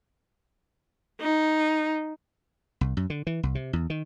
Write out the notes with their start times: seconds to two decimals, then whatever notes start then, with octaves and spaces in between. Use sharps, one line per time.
1.21 D#4
2.81 C2
2.97 F#2
3.10 D3
3.27 E3
3.43 C2
3.55 C3
3.73 E2
3.90 D#3